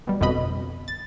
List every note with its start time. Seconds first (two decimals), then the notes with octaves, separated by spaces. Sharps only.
0.07 B2 G3
0.20 G1 F2 B2 D#5 B5
0.88 A6